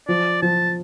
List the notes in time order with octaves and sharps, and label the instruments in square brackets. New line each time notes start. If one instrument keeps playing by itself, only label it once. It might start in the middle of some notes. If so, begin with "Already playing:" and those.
[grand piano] F3 [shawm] D5
[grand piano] F3 [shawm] A5